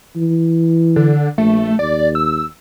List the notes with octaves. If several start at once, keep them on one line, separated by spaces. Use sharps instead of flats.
E3
D3
A#1 A3
D#2 D5
E6